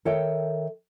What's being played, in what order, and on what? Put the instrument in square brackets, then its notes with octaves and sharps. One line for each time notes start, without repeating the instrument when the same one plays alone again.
[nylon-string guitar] D#3 A4 C#5 E5 G5